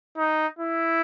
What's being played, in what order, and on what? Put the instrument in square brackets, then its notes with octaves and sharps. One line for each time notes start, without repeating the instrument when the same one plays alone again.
[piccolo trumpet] D#4
E4